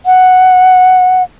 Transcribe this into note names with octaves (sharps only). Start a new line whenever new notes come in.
F#5